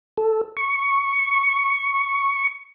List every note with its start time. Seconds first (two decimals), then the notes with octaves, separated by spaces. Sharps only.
0.17 A4
0.57 C#6